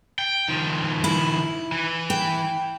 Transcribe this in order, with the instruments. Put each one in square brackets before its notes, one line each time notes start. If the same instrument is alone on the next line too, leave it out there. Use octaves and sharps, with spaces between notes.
[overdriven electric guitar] G5
D#3 F3
[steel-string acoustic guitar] E4
[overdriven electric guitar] E3
[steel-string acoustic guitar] G5